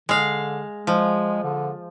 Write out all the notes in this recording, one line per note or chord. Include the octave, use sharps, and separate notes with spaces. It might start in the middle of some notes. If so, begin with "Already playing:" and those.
D3 G#3 F5
F3 G#3
D3